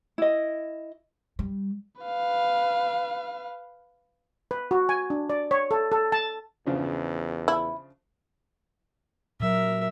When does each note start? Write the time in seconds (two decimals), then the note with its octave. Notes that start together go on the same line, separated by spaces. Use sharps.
0.18 E4 D#5
1.39 G3
2.01 B4 F5
4.51 B4
4.71 F#4
4.89 G#5
5.10 D4
5.30 D5
5.51 C#5
5.71 A4
5.92 A4
6.12 A5
6.66 E2 C#3 F3 D4
7.48 E4
9.40 A#2 F#3 A#4 E5